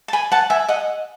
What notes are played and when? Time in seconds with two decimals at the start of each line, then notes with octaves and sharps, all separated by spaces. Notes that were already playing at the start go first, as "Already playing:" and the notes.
0.08 A5
0.13 G#5 B5
0.32 F#5 A5
0.50 E5 G#5
0.68 D#5 F#5